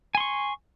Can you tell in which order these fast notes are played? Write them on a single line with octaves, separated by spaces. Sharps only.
G#5 C6 C#6